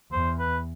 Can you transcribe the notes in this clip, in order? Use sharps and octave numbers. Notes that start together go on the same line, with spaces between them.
E2 C5
B4